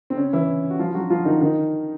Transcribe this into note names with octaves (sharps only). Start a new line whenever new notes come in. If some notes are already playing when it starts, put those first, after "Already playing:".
C4
C#3 C#4
E3 E4
F#4
F3 F4
F4
F#3 F#4
F3 F4
D#3 D#4
D#3 D#4